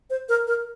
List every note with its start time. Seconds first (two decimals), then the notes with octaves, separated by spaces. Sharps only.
0.10 C5
0.29 A#4
0.47 A#4